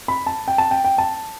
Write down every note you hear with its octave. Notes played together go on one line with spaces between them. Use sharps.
B5
A5
G5
A5
G5
G5
A5